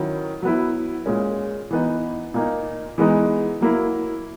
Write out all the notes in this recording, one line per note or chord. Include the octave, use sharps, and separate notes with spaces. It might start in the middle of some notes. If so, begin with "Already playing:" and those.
Already playing: D#3 F#3 C#4 E4
F#3 B3 E4
A#2 G#3 C#4
E3 B3 D#4
A#2 A#3 D#4
E3 G#3 B3 D#4
F#3 A#3 E4